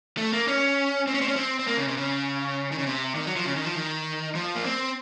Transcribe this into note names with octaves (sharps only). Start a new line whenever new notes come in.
A3
A#3
C#4
C4
C#4
C4
C#4
C4
C4
A#3
C#3
C3
C#3
D#3
C#3
C3
D#3
F#3
F3
C#3
D#3
F3
D#3
F3
A#3
C4